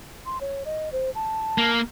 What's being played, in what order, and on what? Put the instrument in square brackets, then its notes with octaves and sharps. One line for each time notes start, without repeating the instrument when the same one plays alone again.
[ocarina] C6
C#5
D#5
C5
A5
[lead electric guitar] A#3